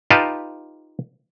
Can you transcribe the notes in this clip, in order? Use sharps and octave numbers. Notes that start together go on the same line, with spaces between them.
D#4 F4 G4 B4 F5 A5